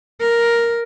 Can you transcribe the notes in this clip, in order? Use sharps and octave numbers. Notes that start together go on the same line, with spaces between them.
A#4